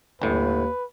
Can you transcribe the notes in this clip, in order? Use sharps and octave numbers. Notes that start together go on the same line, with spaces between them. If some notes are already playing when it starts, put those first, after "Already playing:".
G1 D#2 A2 B4